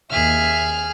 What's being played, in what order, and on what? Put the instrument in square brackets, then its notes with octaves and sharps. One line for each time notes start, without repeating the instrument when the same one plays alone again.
[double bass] D#2 [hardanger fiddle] G#4 [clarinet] E5 [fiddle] F6